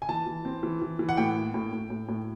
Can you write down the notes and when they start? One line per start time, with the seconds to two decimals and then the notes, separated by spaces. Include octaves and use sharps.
0.02 G#5
0.09 E3 A5
0.27 E3
0.45 C4
0.63 E3
0.82 E3
0.99 E3
1.09 F#5
1.17 A2 G5
1.36 A#3
1.54 A2
1.73 A2
1.90 A2
2.08 A2